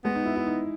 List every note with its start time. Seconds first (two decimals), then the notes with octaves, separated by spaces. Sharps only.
0.04 G#3 B3
0.15 D#4
0.26 E4
0.36 E4
0.47 D#4